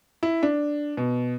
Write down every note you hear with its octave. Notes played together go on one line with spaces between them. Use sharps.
E4
D4
B2